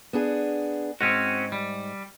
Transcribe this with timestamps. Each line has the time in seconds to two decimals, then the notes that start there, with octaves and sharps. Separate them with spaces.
0.13 B3 D4 G#4
1.01 G#2 C4 C#4 F#4
1.52 G3